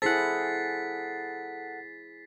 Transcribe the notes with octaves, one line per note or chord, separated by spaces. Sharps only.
E4 G#4 A4 C5 F#5 A6 B6 C7